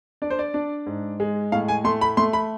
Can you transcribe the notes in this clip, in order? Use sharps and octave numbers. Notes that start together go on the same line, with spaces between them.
D4 D5
C5
D5
D4
G#2
G#3
A2 F5
G#5
A3 C6
B5
A3 C6
B5